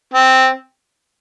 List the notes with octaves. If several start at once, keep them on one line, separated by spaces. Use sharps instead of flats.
C4